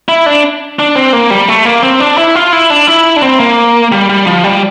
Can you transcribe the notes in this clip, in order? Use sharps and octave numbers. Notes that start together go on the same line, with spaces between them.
E4
D4
D4
C4
A#3
G3
A3
A#3
C4
D4
E4
F4
E4
D4
E4
D4
C4
A#3
G3
G3
F3
G3